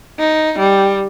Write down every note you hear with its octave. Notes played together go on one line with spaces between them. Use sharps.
D#4
G3